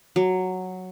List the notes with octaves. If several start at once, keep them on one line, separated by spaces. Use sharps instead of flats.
F#3